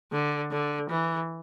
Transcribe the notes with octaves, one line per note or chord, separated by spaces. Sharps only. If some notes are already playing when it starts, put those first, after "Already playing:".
D3
D3
E3